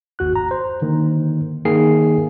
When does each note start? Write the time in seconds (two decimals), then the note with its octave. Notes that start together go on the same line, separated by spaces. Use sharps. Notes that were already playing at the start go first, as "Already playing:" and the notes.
0.19 G1 D#2 F#4 F#6
0.36 A#5
0.51 C5
0.82 D3 D#3 A#3
1.65 D#3 A#3 G#4 C7